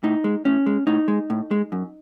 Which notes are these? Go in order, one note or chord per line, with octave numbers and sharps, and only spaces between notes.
A2 D#4
G#3
A2 C#4
G#3
A2 D#4
G#3
A2
G#3
F#2